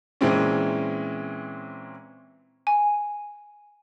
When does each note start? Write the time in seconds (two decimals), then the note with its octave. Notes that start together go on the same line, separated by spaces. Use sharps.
0.21 A#2 E3 G#3 C4 C#4
2.67 G#5